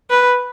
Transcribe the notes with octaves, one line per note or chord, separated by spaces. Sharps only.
B4